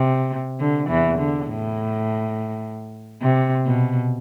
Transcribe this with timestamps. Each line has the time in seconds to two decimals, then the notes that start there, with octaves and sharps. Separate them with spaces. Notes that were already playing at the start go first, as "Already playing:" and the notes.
Already playing: C3
0.60 D3
0.89 E2 E3
1.18 D3
1.47 A2
3.21 C3
3.65 B2